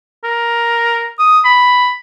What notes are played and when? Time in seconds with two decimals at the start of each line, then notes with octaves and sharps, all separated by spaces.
0.24 A#4
1.19 D#6
1.45 B5